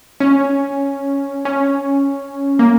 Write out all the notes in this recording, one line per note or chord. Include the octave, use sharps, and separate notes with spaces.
C#4
C#4
A#3